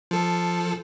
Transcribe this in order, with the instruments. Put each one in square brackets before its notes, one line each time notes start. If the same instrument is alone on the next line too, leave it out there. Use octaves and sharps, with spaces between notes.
[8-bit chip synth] F3 A4